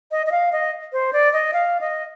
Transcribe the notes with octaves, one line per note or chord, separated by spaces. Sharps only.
D#5
D#5
F5
D#5
C5
D5
D#5
F5
D#5